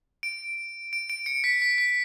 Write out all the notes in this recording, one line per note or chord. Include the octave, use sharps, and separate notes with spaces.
D7
D7
D7
C#7
B6
B6
B6